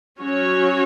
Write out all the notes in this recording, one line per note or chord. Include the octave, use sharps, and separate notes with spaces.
F#3 C#4 F#4 C#5